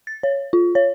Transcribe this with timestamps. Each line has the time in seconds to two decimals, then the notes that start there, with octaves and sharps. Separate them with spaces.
0.07 A6
0.23 C#5
0.53 F4
0.75 C#5